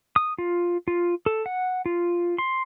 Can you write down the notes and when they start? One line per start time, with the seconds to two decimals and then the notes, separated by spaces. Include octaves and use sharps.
0.16 D#6
0.38 F4
0.88 F4
1.26 A4
1.46 F#5
1.86 F4
2.38 C6